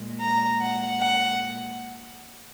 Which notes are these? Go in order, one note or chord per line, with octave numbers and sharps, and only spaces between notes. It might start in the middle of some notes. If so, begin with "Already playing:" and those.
Already playing: A#2 G#3
A#5
F#5
F#5